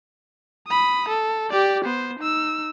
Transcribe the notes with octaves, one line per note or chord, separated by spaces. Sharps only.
B5 D#6
A4
G4 D5
B3 C5
D#4 E6